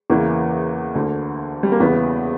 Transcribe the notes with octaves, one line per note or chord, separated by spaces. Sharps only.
E2 C#3 E3 A#3
D2 D3
G3
A#3
E2 C#3 E3 B3